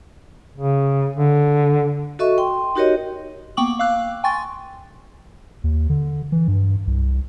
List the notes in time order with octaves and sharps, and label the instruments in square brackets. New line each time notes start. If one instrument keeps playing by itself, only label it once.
[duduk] C#3
D3
[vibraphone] F#4 A4 D#5 E5 C#6
G5 C6
D#4 F#4 G4 A#4 C#5 D#5
[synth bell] A#3 B3 G5 C#6 D6 F#7
F5 D6 E6 F#6
G5 G#5 C6 C#6 A6
[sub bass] D#2
D3
E3
G2
C2